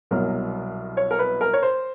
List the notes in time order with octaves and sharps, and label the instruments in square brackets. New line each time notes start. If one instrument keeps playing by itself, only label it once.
[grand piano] C2 B2 F#3 A#4
C#5
A#4
B4
A#4
C#5
C5